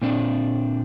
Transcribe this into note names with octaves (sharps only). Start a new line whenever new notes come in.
A#2 C4 D4